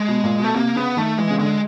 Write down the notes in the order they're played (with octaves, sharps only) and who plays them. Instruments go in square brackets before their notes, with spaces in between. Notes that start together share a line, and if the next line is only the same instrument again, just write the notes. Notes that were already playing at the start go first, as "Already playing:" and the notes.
Already playing: [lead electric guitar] G#3
[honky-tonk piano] B2
A#2
[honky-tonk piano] B2 [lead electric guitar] A3
[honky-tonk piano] C3 [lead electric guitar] A#3
[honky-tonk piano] C#3 [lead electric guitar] B3
[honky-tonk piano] D#3 [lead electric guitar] A3
[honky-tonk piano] E3 [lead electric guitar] G#3
[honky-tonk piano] C#3
[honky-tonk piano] D3 [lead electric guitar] G#3